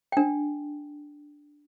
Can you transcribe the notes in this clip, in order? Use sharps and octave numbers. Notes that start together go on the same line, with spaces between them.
D4 G5